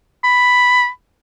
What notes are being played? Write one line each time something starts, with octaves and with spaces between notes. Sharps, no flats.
B5